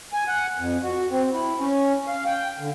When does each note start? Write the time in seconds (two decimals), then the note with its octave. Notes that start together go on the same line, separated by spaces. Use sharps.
0.13 G#5
0.28 F#5
0.58 F2
0.82 F#4
1.11 C4
1.33 E4
1.60 C#4
2.07 F5
2.26 G5
2.59 D3